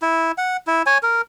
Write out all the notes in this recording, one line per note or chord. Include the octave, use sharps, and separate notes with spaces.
E4
F#5
E4
C#5 G#5
A#4